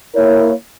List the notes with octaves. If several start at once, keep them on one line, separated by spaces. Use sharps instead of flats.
A#3 E4 A#4 C#5